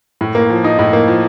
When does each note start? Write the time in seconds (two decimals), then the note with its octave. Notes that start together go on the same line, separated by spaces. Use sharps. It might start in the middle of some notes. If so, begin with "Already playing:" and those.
0.21 A2
0.35 A#3
0.50 F3
0.64 D#4
0.79 A2
0.93 A#3
1.08 F3